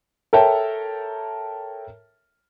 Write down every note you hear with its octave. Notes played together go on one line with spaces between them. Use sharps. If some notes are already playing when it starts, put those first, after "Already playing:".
A4 A#4 C#5 E5 G5 A5